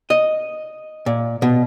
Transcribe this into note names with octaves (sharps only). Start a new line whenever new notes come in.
D#5
A#2
B2